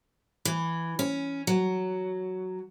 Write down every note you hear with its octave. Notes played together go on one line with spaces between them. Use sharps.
E3
C#4
F#3